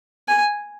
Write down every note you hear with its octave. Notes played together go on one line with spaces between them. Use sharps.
G#5